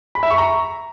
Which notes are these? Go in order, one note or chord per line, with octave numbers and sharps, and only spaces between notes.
B5
E5
C#6
A#5